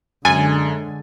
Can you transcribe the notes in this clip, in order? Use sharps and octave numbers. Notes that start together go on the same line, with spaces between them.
F#2 D3 G#3 G#5 A6